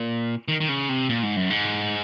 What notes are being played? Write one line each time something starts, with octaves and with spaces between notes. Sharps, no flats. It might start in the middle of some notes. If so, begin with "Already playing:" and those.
Already playing: A#2
D#3
D#3
C#3
C3
A#2
G#2
F#2
G#2